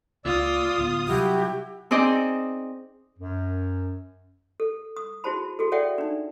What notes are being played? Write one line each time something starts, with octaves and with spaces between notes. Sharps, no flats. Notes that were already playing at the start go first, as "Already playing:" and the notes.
C#2 G#3 A#3 F4 D5 D#6 E6
D1 D2 B3
C3 F#3 G3 E4 F#4 G4
C4 D#4 G#4 C5 D5 D#5
F#2
A4
D#6
E4 F#4 G#4 C5 A5 B5
E4 F#4 G#4 A4
A4 C#5 D5 E5 F#5 G5
D4 D#4